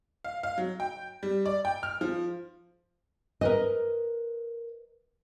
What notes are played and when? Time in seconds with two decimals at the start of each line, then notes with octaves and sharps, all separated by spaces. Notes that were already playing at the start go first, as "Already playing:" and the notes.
0.24 F5
0.43 F5
0.58 F#3
0.80 G5
1.23 G3
1.46 D5
1.65 G5
1.83 F6
2.01 F3
3.41 A#4 B4 D#5